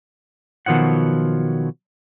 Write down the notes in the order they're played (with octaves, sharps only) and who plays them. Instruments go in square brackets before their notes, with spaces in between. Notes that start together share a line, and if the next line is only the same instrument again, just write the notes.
[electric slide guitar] B2 D#3 F3 F#3 F#5